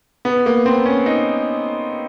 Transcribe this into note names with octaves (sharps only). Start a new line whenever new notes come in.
B3
A#3
C4
C#4
D#4